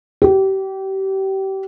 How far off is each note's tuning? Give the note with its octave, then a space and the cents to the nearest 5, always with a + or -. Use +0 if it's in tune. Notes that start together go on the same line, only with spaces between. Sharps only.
G4 -30